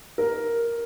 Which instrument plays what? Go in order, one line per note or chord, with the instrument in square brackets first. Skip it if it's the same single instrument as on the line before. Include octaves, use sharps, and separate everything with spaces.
[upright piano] A#4